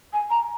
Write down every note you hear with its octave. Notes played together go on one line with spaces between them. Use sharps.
G#5
A#5